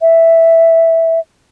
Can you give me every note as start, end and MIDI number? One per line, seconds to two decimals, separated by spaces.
0.01 1.19 76